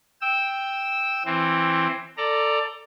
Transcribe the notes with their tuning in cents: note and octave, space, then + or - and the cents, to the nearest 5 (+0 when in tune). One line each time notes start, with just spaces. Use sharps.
G5 +0 E6 -10
E3 +10 C4 +15
A4 +20 D5 +5 A#5 +0